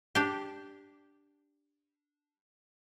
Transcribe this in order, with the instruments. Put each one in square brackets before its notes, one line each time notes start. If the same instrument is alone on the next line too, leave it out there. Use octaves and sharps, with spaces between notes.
[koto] D4 G4